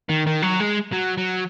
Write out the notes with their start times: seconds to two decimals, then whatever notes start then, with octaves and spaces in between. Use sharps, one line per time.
0.09 D#3
0.27 D#3
0.42 F#3
0.60 G#3
0.93 F#3
1.17 F#3